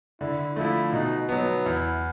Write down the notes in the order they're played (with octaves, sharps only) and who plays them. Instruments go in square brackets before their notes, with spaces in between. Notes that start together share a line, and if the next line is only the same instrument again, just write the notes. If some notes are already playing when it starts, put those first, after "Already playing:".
[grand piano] D3 [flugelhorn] E4
[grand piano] F3 A3 [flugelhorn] E4
[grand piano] B2 [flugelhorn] D#4
[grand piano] F#3 B3 [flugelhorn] D#4
[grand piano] E2 [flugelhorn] E4